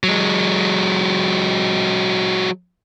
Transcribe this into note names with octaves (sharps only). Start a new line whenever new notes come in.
F#3 G#3